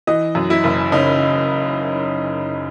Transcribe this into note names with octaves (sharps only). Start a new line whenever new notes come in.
E3 D#5
F#2
E4
F#1
C#3 D#4